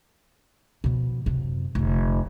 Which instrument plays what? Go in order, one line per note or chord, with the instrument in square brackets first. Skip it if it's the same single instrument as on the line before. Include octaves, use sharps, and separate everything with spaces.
[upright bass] B2 F3
F#2 C3
F1 D3